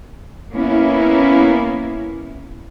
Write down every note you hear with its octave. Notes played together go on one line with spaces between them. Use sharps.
A#3 B3 C#4 E4